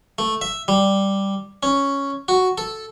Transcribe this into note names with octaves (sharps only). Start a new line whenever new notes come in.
A3
E5
G3
C#4
F#4
A4